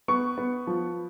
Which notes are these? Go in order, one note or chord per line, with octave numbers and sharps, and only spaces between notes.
B3 C#6
B3
F3